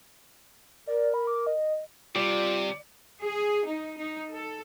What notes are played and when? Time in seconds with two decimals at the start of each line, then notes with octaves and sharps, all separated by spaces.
0.87 A#4 D5
1.14 B5
1.27 D6
1.47 D#5
2.16 C3 G3 F4 D5
3.21 G#4
3.66 D#4
3.98 D#4
4.33 A4